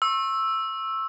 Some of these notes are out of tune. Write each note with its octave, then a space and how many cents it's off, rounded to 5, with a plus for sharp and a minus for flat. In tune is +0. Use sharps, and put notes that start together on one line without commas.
C#6 -40 E6 +0